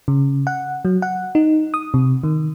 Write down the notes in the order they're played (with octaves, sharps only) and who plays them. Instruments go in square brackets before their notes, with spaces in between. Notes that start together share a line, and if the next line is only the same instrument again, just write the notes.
[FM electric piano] C#3
F#5
F#3
F#5
D#4
D#6
C3
D#3